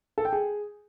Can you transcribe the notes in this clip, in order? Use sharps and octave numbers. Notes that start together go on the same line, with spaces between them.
A4
G5
G#4